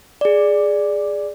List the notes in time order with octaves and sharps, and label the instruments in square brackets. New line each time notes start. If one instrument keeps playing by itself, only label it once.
[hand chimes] G#4 D5